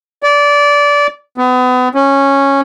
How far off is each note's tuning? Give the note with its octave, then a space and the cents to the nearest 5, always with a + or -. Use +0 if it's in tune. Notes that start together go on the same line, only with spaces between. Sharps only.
D5 -20
B3 +35
C#4 -10